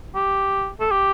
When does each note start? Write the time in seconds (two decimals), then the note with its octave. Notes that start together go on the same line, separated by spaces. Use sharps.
0.15 G4
0.80 A4
0.91 G4